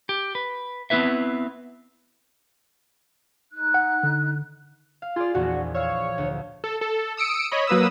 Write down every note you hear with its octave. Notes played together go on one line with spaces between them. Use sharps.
G4
B4
B3 C4 E4 B4 E5
D#4 F#6
F#5
D3
F5
F4 G#4 D5
A#1 E2 F#4
C#5 F5 E6
D2
A4
A4
D#6 E6 C#7 D7
C#5 D#5 B5
F#3 A#3 B4 D#6 E6